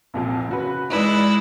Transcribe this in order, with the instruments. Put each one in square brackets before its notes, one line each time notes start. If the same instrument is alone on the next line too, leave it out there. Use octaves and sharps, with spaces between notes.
[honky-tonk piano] C2 F2 A#2
C#3 F#4 B4
[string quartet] G#3 E4 [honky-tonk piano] D#4 B4 D5